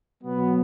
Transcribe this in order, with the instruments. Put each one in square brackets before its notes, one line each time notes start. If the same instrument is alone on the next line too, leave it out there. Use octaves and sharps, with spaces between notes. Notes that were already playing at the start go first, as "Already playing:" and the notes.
[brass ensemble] B2 F#3 B3